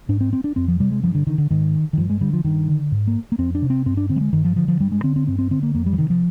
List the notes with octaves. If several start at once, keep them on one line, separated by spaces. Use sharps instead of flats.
G#2 D4
C4
C4
D4
F2 C4
F3
C3 G3
G#3
G2 F3
D3
D3 D#3
D3
G#2 D#3
D#3
G2 F3
G#3
D3 G3
F3
G2 D#3
D3
G#2
A#3
A#3
F2 C4
D4
C3
C4
G2 C4
D4
D3 C4
G3
G#3
G2 D#3
F3
D3 F3
F3
G2 G3
G#3
D3 C4
C4
G2 C4
C4
D3 C4
A#3
F2 A#3
G3
F3
C3 D#3
F3